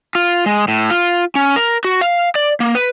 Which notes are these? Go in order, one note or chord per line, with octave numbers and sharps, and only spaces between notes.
F4
G#3
A2
F4
C#4
A#4
F#4
F5
D5
A#3
B4